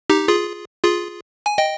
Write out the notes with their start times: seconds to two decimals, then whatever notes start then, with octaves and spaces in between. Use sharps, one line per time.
0.10 D#4 G4
0.28 F4 G#4
0.83 F4 G#4
1.46 G#5
1.58 D#5 G5